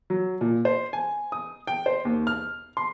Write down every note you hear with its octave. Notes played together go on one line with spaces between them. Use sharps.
F#3
A#2
C5
G#5
D#6
G5
C5
D#2
F6
C6